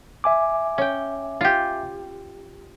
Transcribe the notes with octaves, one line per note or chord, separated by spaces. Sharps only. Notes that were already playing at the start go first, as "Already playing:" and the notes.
E5 G#5 D6
C#4 G5
F4 G4